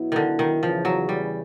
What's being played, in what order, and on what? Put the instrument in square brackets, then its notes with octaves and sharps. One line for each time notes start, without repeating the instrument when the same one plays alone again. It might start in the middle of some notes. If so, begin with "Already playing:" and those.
Already playing: [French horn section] B2 F#3 B3 E4
[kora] D3 D#3
D#3
[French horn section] E2 C#3 E3 [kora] F3
[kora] F#3
G3